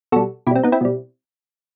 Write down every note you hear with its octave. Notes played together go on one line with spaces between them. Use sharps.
B2 G3 F#4 A4
B2 G3 C4 E4 G4
B3 D#4
C4 E4
B2 G3